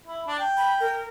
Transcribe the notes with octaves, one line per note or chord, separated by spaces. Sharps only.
E4
D4
G5
B5
A#4